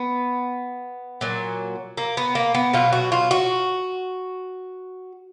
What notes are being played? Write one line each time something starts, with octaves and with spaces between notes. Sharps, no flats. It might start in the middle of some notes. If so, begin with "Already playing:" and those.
Already playing: B3
A#2 F#3
A#3
B3
A#3
B3
B2 F#3 F4
F#4
F4
F#4